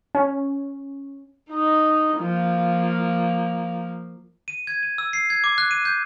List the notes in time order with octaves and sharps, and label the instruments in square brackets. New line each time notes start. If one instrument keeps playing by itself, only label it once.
[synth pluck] C#4
[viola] D#4 D#5
F3 A#3
[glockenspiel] D#7
G#6
D#7
E6
C7
G#6
D6
F#6
D#7
G6